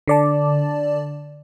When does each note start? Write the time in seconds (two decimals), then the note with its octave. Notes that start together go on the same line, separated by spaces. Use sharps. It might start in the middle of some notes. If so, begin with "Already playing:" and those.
0.08 D3 D5 A5